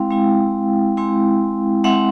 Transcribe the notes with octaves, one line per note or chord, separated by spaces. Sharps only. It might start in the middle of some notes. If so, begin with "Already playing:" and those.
Already playing: G#3 C4 E4 F5 G5
G#3 C4 E4
G#3 C4 E4
G#3 C4 E4 E5 F#5